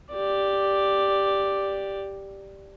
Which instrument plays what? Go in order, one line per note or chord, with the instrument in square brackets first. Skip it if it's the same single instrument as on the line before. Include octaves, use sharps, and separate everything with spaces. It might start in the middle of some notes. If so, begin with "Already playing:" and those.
[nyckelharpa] G4 D5